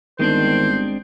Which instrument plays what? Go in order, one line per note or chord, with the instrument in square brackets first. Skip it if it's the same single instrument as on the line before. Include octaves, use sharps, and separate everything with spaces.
[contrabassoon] G1 [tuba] D#3 [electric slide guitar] G#3 C4 D4 [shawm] C5